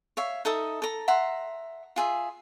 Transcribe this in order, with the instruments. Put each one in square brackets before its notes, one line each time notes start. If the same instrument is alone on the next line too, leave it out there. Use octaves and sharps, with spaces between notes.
[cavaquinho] C#5 E5 F5
D#4 A4 E5 D#6
A4 A#5
E5 F#5 A#5 C6
F4 G#4 E5